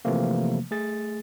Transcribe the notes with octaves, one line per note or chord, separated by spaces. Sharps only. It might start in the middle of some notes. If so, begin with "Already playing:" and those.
C3 E3 F3 A3 A#3
A3 G#4 A6